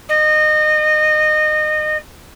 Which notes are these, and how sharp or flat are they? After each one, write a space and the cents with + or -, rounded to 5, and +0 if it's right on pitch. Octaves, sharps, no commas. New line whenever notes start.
D#5 -25